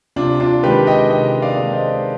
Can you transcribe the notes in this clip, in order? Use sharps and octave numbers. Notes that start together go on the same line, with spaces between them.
C3 D4 F4
D4 F4
D#3 G#3 G4 B4
D#5 G5
C3 D#5 G5
D5 F5
D#3 G#3
C5 D#5